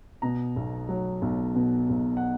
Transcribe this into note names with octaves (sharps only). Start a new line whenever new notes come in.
B2 A#5
B1
F#3
B1
B2
B1
F#5